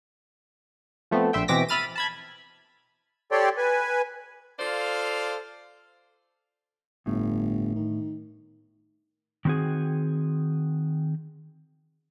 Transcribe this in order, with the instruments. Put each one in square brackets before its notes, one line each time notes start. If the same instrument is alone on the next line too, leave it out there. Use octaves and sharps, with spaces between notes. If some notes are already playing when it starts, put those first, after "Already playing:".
[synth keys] F3 A3 B3 C4
A#1 C5 E5 G5
B2 E3 C4 D6 A#6 B6
E5 B5 F6 A6 D#7
A5 B5 G#6
[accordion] G4 A4 C#5 D5 G5 C6
B4 G#5
[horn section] F4 A4 C5 D5 F5
[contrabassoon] G1 [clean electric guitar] A2
[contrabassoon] D#3
[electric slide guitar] D#3 F#3 C4 F#4 G#4